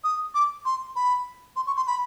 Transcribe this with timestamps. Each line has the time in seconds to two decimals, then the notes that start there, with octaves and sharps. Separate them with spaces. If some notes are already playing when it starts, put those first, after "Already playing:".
0.04 D#6
0.35 D6
0.65 C6
0.96 B5
1.56 C6
1.67 C#6
1.77 C6
1.87 B5